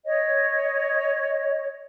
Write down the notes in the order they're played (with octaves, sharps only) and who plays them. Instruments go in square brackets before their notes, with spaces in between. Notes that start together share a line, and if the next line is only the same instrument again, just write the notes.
[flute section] C#5 D#5